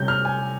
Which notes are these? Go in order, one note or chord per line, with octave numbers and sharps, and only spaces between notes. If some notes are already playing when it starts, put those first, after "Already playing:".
Already playing: C3 G3 C#4 G6
F6
G#5